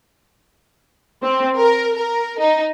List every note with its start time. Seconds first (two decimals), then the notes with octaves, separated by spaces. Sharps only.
1.23 C4
1.57 A#4
1.96 A#4
2.39 D#4